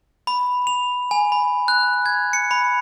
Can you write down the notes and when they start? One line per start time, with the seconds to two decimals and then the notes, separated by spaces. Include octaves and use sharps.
0.27 B5
0.67 F7
1.11 G#5
1.32 B5
1.68 F#6
2.06 G#6
2.33 C#7
2.51 B5